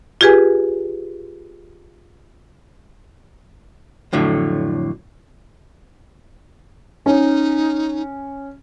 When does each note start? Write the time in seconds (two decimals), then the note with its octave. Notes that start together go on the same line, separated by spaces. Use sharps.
0.21 F4 G4 G#4 B4 G#5
4.13 F2 A2 D3 F#3
7.06 C#4 D#4